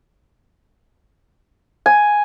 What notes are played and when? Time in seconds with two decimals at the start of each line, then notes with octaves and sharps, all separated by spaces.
1.86 G#5